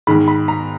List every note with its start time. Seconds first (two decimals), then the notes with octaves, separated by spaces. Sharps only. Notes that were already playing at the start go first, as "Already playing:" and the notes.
0.07 G#2 D#3 G#3 B5
0.28 B5
0.48 A#5